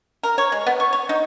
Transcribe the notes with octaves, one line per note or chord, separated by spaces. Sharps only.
A#4
C#5
G#3
B3
C#6
C#5
D#4